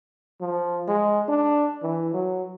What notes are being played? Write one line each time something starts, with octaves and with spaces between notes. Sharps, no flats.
F3
G#3
D4
E3
F#3